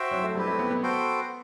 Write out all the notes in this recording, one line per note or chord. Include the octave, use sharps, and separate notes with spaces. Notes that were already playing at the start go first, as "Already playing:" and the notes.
Already playing: F#4 C5 E5 G5
F#3
A3
G3 C4 E4 G4 B4
A3
B3
B3
F#4 A4 C5 G5